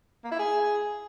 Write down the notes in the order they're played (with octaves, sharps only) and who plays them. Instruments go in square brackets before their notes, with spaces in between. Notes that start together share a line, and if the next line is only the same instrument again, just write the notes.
[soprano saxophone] A#3
E4
G#4